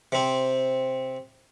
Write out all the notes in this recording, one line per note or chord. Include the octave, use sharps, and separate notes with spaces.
C3 C4